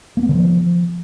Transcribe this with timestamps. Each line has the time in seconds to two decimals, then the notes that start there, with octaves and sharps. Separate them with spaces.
0.17 A#3
0.23 B3
0.29 D3
0.35 F3